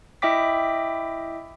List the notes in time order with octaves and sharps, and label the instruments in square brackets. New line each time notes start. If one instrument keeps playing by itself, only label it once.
[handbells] E4 D#5 E5 G5 D6 B6